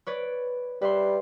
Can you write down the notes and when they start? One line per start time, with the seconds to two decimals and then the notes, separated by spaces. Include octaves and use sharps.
0.07 B4 C#5 D5
0.82 G3 B4 E5 C6